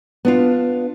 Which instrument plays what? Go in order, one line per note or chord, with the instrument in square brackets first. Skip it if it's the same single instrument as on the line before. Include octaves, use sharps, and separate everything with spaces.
[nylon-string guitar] B3 D4 F4